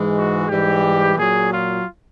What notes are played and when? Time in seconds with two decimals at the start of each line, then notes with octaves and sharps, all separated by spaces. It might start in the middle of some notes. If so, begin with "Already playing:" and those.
Already playing: G#2 E3 G#3
0.15 F#4
0.49 G#2 E3 G3 G4
1.16 A#2 F#3 G#4
1.50 F4